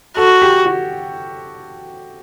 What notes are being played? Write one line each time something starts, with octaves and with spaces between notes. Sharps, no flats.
F#4 A4
G4
F#4